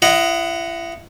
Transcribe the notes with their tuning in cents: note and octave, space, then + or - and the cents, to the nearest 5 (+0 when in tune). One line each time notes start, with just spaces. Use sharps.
E4 +40 D#5 +0 F#5 +0